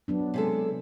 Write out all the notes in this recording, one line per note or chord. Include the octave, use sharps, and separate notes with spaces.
F#3 B3 D4
C3 G#3 A4